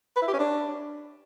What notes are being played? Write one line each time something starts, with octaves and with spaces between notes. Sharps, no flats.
B4
E4
G4
C#4
D4